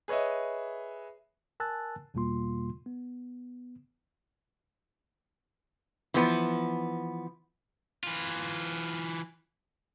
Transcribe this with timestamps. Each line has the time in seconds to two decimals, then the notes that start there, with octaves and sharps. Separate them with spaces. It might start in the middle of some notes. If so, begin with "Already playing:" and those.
0.08 G#4 B4 C#5 D#5 E5
1.60 A#4 G#5 A5 E6 F#6 A6
2.14 E2 B2 G3 A#3 F4 C6
2.86 B3
6.14 E3 F3 B3
8.03 E3 F4